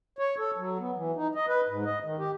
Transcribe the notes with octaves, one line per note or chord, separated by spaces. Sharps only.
C#5
A4
F#3
B3
E3
D#4
D#5
B4
G#2
D#5
D#3
G4